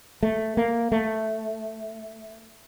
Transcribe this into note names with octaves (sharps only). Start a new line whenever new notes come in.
A3
A#3
A3